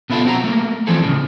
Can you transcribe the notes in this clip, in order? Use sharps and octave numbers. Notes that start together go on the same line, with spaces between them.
B2 B3 E4 F4 A4
C4 F#4 A#5
A3 A#3
E3 F3 C4 G#4 A4
E2 A2 C#3